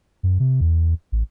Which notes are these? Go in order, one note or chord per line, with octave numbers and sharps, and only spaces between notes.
F#2
C3
E2
A1